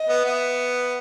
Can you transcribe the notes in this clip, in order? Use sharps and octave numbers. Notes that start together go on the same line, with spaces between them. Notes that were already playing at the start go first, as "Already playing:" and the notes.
Already playing: D#5
B3
B3 E5